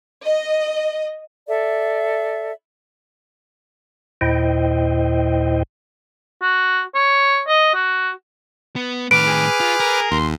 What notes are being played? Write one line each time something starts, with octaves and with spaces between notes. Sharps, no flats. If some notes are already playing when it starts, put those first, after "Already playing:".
D#5
A4 D5 E5
D#2 A#2 E4 C5 D#5 G5
F#4
C#5
D#5
F#4
B3
A2 D#3 B4 D6 F6 D7
G#4
F4
A#4
D#2 C6